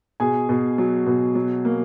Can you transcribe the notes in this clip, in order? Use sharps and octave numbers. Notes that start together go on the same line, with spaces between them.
B2 G#4 G#5
B2
F#3
B2
F#3
A#3